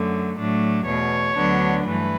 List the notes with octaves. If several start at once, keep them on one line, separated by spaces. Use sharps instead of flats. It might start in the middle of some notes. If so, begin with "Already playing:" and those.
Already playing: F#2 D3 F#3 A3
A2 F#3 A3 D4
E2 B2 A3 C#5
D2 D3 F#3 B3 D4
G2 E3 A3 B4